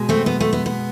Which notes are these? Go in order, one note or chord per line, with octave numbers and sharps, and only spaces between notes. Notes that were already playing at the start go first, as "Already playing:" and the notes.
Already playing: B2 G#3
A3 C4
B3
A3
B3
B3